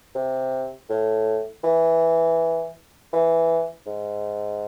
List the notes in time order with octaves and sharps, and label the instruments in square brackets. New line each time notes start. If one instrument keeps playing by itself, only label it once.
[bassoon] C3
A2
E3
E3
G#2